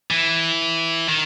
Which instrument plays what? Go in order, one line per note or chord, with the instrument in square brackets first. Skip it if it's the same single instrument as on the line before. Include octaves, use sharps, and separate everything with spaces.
[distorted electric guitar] E3
D#3